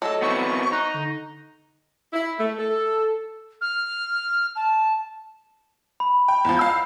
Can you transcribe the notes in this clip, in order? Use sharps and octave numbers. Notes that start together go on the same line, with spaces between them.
F#3 A3 A4 D#5 A5
B3 C4 E4 C#6
D#4 F#6
D3
E4
A3
A4
F6
A5
B5
G5
E2 F3
F5 E6 G6